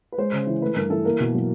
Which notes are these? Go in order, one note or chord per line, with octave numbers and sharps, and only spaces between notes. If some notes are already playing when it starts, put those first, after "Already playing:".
B4
G#3 C5
C#3
E3
A3 B4
G2 A#4
E3 A4
A#3 A#4
B2
F#3